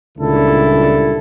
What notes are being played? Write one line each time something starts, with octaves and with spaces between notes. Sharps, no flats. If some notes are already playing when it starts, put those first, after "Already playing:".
C#2 A#2 D3 G3 E4 A4